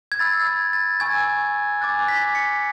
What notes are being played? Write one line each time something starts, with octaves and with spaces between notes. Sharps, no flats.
G#6
B5 E6 A6
G#6
A6
G#5 C#6 E6 G#6
G#5 D6 F#6 A6
B6
C#7